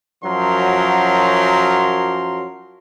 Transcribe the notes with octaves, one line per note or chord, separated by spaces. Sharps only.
F#2 F3 F#3 A#4 C6